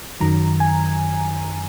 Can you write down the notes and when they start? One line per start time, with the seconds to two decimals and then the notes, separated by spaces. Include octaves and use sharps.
0.20 F#2 D#3 F#3 A#5
0.60 G#5